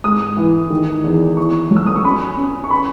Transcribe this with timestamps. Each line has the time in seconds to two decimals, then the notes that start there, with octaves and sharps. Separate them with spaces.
0.04 G#2 D#6
0.37 E3
0.70 D#3
1.04 E2
1.37 E4 C#6
1.71 F#3
1.76 E6
1.86 D#6
1.96 C#6
2.04 C#4 B5
2.37 C#4
2.64 C#6
2.71 B5